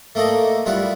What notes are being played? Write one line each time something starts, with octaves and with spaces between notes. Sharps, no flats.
A3 A#3 A4 D5 D#5
G3 E4 F4 E5 F#5